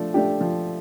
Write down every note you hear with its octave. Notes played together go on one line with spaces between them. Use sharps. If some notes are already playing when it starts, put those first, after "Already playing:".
Already playing: F3 A3 D4
A3 D4 G4
F3